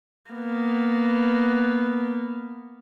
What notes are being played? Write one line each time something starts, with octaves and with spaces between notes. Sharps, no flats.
A#3 B3